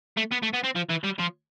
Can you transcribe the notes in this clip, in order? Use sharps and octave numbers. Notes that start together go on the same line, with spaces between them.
A3
B3
A3
B3
C4
F3
E3
G3
F3